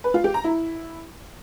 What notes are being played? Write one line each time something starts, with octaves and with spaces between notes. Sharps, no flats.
B4
F4
G4
A#5
E4